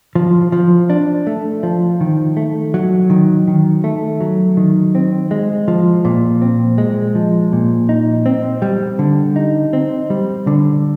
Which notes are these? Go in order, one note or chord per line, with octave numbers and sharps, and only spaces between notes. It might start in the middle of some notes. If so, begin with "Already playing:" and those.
F3
F3
D4
A3
F3
D#3
A3
F#3
D#3
D#3
A3
F#3
D#3
C4
G#3
F3
A#2
C4
G#3
F3
A#2
D#4
C4
G3
D3
D#4
C4
G3
D3